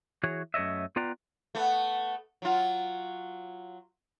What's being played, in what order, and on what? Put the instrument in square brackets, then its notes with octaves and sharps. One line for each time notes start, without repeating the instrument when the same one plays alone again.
[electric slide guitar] E3 F#4 G#4 C#5
F#2 A3 C#5 D#5 E5
B3 F4 B4 D5 G5 A#5
[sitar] A3 B3
F#3 F4